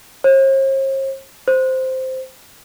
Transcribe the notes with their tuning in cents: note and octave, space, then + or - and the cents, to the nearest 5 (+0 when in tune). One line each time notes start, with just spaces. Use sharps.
C5 +45
C5 -5